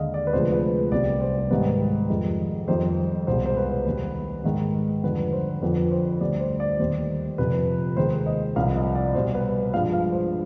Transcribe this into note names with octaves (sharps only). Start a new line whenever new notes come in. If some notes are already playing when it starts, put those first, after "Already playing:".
Already playing: D#2 D3 G#3 D#5 F5
D5
B4
D2 C3 F3 G#3 C5
B4
C2 C3 G3 D5
C5
G#2 D#3 G3 B4
F2 D#3 G#3
F2 D#3 G3 C5
C2 B2 G#3 C5
C5
B4
D#2 D#3 G3
G#2 D#3 G#3
F2 D3 G3 B4
C5
F2 D3 F3 B4
C5
D2 D3 G3 D5
C5
D5
D#2 D#3 G3 C5
F2 C3 F3 B4
D#2 D#3 G#3 C5
D#5
C2 C3 F3 F5
D#5
D5
C2 B2 G3 C5
B4
G2 F3 G#3 F5
F5
C5